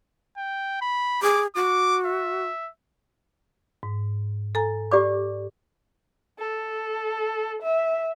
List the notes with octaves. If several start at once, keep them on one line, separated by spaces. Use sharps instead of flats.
G5
B5
G#4 D6
F#4 D6
E5
G#2
A4 G#5 A#5
G4 D5 D6
A4
E5